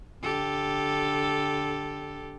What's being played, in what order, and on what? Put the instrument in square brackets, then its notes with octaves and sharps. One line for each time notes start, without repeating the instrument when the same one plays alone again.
[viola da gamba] D3 G4 A4